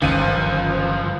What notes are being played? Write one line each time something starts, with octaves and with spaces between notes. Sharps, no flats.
G1 C#2 F#2 D#3 F3 D#7